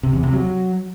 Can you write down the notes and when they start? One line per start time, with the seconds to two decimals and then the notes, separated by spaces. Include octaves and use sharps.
0.03 C3
0.13 E2
0.23 C3
0.33 F#3